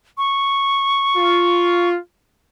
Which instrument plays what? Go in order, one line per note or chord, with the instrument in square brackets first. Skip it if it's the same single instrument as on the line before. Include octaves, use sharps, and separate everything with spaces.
[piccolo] C#6
[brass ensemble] F4